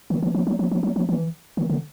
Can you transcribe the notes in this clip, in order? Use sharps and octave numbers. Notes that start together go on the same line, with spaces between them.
D#3
E3
F3
F#3
F3
F3
F#3
F3
E3
D#3
D3